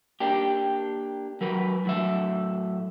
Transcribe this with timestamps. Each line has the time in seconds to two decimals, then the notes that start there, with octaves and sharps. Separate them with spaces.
0.20 A#3 D4 G4
1.41 F#3 A#4 B4
1.85 A2 F#3 E5